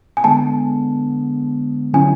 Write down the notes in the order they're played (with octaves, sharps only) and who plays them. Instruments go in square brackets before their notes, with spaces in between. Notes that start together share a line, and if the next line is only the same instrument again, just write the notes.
[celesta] G#5
[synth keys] D3 G#3 B3 [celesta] A5
[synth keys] D3 F#3 C#4 E4 [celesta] G#5